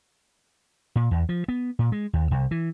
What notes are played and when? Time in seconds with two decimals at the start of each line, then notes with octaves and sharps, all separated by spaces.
0.96 A#2
1.11 E2
1.29 F3
1.48 B3
1.79 A#2
1.92 G#3
2.13 D#2
2.31 C2
2.51 E3